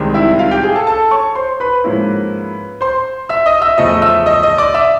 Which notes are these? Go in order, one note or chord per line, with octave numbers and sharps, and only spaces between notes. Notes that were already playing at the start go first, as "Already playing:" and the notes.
Already playing: C2 C3 D#3 G#3
E4 E5
F4 F5
G4 G5
G#4 G#5
A4 A5
A4 A5
C#5 C#6
C5 C6
B4 B5
G#2 F3 A#3 C#4 E4
C5 C6
E5 E6
D#5 D#6
E5 E6
E2 C#3 F3 A3 D#5 D#6
E5 E6
D#5 D#6
D#5 D#6
D5 D6
E5 E6